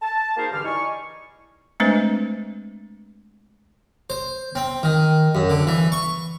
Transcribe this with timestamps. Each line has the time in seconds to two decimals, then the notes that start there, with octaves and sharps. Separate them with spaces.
0.02 A5
0.37 A#3 D#4 F#4 G#4 A#4 C5
0.52 G2 D3 E3 G4 F6
0.65 D#4 E4 D5 G#5 C#6
1.80 G#3 A3 C4 D4 B4 C5
4.10 C5
4.55 C4
4.83 D#3
5.35 F#2
5.50 D3
5.67 E3
5.92 C#6